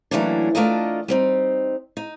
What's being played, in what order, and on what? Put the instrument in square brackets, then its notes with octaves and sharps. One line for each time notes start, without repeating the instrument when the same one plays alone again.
[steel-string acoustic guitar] E3 F#3 A3 A#3 C#4 D4
A3 D4 F4 A4 A#4 D#5
G3 C4 D#4
D#4